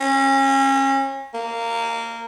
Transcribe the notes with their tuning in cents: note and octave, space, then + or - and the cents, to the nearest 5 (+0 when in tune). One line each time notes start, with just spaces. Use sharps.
C#4 -35
A#3 -15